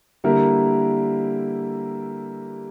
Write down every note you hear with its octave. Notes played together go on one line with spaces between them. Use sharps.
D3 G3 A#3 E4 A#4